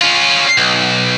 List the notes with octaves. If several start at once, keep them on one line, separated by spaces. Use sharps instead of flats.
C#4 F4
B1